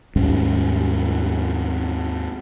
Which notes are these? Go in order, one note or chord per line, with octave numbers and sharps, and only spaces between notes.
D#2 G#2 G3 C#4